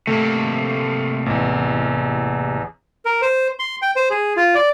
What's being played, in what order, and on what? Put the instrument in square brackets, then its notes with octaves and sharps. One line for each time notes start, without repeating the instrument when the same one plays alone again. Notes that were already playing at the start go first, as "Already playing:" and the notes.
[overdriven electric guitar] C3 A#3 [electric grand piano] A3
[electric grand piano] A1 E2
[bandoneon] A#4
C5
C6
G5
C5
G#4
F4
D5